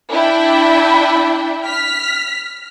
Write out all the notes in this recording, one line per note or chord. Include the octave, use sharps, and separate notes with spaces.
D4 E4 E5 G5
F6 B6